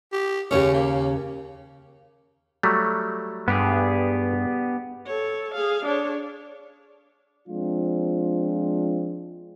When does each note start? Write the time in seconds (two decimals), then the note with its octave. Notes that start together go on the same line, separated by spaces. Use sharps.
0.12 G4
0.51 D#2 C#3 C#4 G4
0.73 A#3
2.63 F#3 G3 A3
3.48 G2 B3 G4 G#4
5.07 A4 C#5
5.55 G#4 F5
5.85 D4 C#5
7.48 F3 G#3 C4 D4 F4